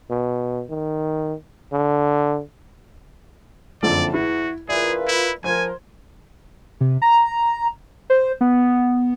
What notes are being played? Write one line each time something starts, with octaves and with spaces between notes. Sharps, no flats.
B2
D#3
D3
F#1 F2 D3 C4 E4 D5 A5
E2 E4 F#4
C#2 E3 F4 G#4 A#4 B4 D5 E5
E4
F3 A#4 C5 G#5 G#6
C3
A#5
C5
B3